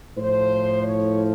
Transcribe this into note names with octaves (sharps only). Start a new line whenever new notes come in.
A2 F3 C5
C#5